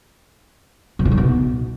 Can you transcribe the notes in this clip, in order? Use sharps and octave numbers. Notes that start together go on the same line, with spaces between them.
B2
F3
D#3
B2